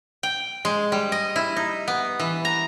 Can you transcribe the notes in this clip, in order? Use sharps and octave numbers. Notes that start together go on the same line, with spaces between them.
G5
G#3
G3
D#5
E4
D#4
B3
E3
A#5